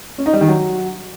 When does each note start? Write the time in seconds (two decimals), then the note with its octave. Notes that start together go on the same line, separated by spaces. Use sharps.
0.18 C#4
0.26 D#4
0.33 G3
0.41 D#3
0.49 F#3